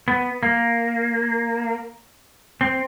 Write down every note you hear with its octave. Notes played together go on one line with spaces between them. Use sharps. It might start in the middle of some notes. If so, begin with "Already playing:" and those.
B3
A#3
C4